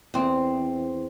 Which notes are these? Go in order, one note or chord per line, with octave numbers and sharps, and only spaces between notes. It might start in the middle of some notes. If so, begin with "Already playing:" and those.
E2 C4